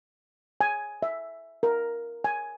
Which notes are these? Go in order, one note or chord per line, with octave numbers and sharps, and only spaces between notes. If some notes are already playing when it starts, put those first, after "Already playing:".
G#5
E5
A#4
G#5